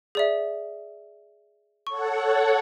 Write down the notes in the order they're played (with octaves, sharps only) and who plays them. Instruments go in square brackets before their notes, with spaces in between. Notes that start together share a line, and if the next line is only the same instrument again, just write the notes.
[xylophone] G#4 D5 E5
[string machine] A4 C#5 F#5 [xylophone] C#6